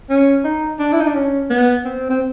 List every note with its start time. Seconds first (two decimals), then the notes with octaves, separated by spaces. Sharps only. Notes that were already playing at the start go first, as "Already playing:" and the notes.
0.10 C#4
0.45 D#4
0.80 D4
0.92 E4
1.00 D#4
1.07 D4
1.15 C#4
1.50 B3
1.85 C4
2.10 C4